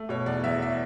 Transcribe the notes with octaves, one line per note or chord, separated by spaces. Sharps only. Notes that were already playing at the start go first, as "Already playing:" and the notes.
Already playing: A3
B2 C#5
E2 D5
E2 E5
E5